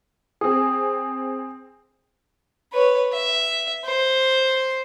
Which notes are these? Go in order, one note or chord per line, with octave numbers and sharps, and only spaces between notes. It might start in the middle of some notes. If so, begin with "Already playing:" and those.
C4 G#4 D#6
B4 C#5
E5
C5